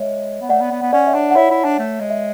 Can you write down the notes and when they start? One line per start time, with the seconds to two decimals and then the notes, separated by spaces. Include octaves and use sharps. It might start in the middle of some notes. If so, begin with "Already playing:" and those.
Already playing: G#3 C#5 E5
0.41 B3
0.49 A3 D5 F#5
0.61 B3
0.71 B3
0.82 B3
0.93 C#4 D5 F#5
1.07 C#5 E5
1.14 D4
1.31 F#5
1.36 E4 C#5 E5
1.50 E4
1.64 D4
1.79 A3
2.00 G#3
2.10 E5